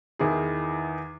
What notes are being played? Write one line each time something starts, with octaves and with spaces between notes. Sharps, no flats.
E2 D#3 E4 G#4